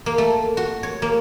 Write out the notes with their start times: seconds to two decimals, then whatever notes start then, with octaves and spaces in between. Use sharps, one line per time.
0.06 A#3
0.18 A3
0.57 F#4
0.83 C#5
1.02 A#3